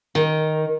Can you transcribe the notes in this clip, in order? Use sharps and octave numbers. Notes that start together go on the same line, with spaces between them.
D#3